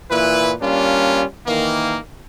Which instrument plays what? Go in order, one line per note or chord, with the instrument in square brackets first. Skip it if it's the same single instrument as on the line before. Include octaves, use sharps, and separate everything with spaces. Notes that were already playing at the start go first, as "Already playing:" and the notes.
[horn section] A#2 E3 E4 B4
G3 A#3 C#4 D4 F4
D#3 E3 A#3